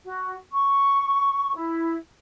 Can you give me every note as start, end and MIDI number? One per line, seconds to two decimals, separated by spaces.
0.05 0.34 66
0.51 1.53 85
1.54 1.94 64